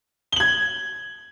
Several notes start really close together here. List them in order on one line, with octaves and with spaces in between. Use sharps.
G7 F#7 G#6